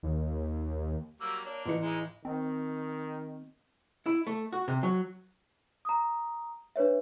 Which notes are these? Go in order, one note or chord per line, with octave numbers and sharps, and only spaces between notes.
D#2
F#3 G3 A#3 E6
A#3 D4 C#5
A1 E3 B4 C#7
G#3 D#4 E4 A#5
D#3 C4
E4
A3
F#4
C3
F#3
A#5 D#6
D4 B4 C#5 E5